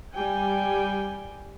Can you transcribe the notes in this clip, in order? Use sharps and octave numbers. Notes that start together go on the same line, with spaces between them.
G3 G5 G#5